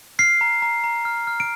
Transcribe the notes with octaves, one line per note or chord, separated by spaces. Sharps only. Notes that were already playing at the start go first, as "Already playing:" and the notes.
F6 C7
A#5
A#5
A#5
F6
F6
D7